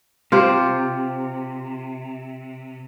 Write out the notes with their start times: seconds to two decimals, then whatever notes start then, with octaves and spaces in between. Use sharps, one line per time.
0.32 C3 F4 G4 C5